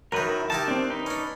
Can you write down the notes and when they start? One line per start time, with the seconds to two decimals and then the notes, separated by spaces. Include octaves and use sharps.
0.12 F#2 D#3 A#4 B4
0.26 E4
0.50 D#3 E4 G4 A5
0.68 C4 D4
0.90 D#4 B4
1.06 C#4 D4